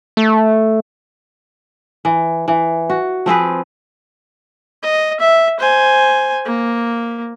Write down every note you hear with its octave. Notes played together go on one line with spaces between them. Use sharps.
A3
E3
E3
F#4
F3 C4 G#4 B4
D#5
E5
C5 G#5
A#3